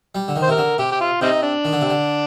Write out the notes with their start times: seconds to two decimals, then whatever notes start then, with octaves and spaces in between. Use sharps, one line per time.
0.15 G3
0.28 D3
0.36 D#3
0.42 C5
0.48 C3 A#4
0.57 D3
0.78 C3 G4
0.92 G4
1.01 F4
1.21 C3 G3 C4 D#4
1.43 D4
1.65 D#3
1.73 D3
1.81 C3
1.89 D3